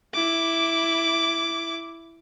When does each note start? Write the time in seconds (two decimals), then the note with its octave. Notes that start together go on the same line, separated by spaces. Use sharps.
0.14 E4 D6